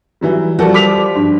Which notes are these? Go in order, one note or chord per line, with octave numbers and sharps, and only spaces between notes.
E3 F#3 G3
F3 G3 F#4 A4
D6 B6 F7
G2